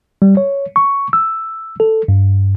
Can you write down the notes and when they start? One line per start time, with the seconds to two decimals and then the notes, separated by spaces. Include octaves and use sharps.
0.22 G3
0.37 C#5
0.76 C#6
1.13 E6
1.80 A4
2.08 G2